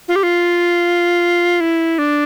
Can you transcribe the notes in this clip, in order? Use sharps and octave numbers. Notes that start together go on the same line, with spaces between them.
F4
G4
F4
E4
D4